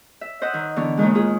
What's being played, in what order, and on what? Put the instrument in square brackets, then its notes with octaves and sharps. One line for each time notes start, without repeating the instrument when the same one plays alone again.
[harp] E5
C5 D#5 E5 F#5
D#3
D3 E3 B3 C#6
D#2 A#2 D#3 G#3
F4 G#4